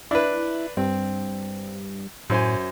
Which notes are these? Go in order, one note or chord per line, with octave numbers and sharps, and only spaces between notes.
D4 E4 B4
G2 C4
F#2 A2 C5 G#5